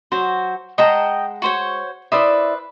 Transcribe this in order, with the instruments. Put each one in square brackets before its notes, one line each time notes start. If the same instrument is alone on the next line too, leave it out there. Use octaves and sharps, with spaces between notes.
[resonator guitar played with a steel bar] F#3 F#4 [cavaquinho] C5
[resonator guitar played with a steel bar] G#3 F#5 A5 [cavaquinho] D#5 G5 A#5
[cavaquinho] F#4 C5 C#5
[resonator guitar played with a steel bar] E4 D5 E5 [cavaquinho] B4 C5 D#6